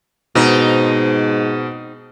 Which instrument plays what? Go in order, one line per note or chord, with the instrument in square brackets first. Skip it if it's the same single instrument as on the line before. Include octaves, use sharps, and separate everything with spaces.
[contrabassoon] G#2 [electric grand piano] B2 [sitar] C4 D#4